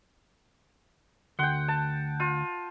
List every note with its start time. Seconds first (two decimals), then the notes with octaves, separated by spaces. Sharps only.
1.39 D2 F#5 G5 C6
1.68 A5
2.20 F4